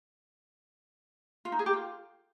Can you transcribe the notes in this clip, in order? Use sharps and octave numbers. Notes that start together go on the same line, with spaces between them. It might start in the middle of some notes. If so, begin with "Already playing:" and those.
F4
D#4
G#4
G4
F4